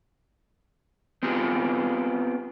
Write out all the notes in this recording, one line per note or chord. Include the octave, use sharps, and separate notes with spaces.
B3 C4 F4 G4 G#4